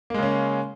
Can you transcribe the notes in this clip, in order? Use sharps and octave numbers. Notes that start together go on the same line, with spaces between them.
C#3 G#3 A#3 C#4